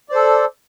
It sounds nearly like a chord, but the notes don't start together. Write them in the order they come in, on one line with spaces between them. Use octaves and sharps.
D5 C5 A4